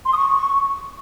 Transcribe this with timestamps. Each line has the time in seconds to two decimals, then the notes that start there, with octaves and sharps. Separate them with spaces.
0.06 C6
0.11 D#6
0.16 C#6